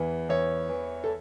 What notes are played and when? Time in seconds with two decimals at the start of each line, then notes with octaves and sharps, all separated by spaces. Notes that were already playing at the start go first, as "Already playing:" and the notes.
Already playing: E2 E3
0.29 E2 C#5
0.69 E3
1.04 A4